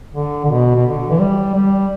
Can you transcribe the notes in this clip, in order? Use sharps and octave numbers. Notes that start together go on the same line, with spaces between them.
D3
D3
B2
B2
D3
E3
G3
G3